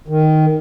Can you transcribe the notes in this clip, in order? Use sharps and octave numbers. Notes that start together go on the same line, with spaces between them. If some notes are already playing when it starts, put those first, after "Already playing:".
D#3